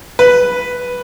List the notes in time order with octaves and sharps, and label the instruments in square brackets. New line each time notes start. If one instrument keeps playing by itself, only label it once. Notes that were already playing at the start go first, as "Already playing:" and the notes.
[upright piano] B4